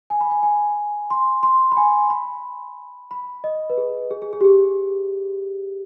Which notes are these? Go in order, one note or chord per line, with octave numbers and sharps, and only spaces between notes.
G#5
B5
G#5
G#5
C6
C6
B5
G#5
B5
B5
D#5
B4
G#4
G#4
G#4
G#4
G4
G#4